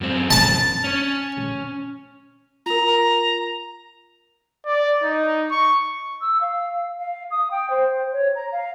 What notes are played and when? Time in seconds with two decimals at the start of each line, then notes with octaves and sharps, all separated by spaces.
0.01 F#2 C4
0.31 A5
0.84 C#4 C#5
2.66 F4 A#4 A#5
4.66 D5
5.04 D#4
5.51 C#6
6.21 E6
6.41 F5
6.99 F5
7.31 D#6
7.51 G5
7.70 C5
8.12 C#5
8.35 A#5
8.52 F5